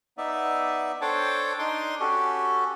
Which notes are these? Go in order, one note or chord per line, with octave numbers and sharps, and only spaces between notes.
B3 D#4 D5 E5
D4 A4 C5 C#5 G5 A5
D4 D#4 C6 D6
C#4 F#4 G4 A4